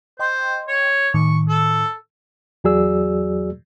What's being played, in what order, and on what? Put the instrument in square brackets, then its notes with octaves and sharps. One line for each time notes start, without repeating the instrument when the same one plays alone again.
[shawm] C5 [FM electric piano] D#5 G5 C6
[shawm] C#5
[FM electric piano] A2 D#3 [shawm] C#6
[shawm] A4
[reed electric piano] E2 F#3 F#4 G#4 D5 E6